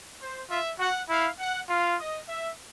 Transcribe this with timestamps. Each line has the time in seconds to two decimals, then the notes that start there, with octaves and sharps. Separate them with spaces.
0.21 C5
0.50 F4 E5
0.79 F#4 F#5
1.10 E4 F5
1.39 F#5
1.69 F4 F5
1.99 D#5
2.28 E5